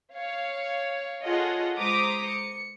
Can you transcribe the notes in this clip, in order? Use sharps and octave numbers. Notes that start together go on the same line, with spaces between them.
C#5 F5
F4 G#4 A4 C#5 D#5 F#5
G#3 C5 A#5 D6 D#6 B6
C#7